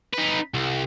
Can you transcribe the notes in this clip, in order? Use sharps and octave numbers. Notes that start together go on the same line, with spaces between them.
D#4 B4
C2